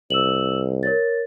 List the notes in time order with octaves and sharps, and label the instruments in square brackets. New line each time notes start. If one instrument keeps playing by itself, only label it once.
[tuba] C2 [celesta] E6 E7 F#7
[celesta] A#4 C#5 A6